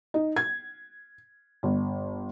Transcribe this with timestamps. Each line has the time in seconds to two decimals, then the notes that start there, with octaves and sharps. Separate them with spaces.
0.14 D#4
0.36 G#6
1.63 G1